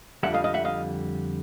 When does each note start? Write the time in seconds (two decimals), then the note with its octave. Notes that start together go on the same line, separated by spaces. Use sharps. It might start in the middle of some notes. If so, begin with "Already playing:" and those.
0.23 F2 D3 G3 E5 F#5
0.34 D#5 F5
0.44 D#5 F5
0.54 E5 F#5
0.65 D#5 F5